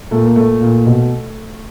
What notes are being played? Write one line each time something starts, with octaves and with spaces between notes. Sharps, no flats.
A#2 A3
A#3
A#2 A3
A#2
B2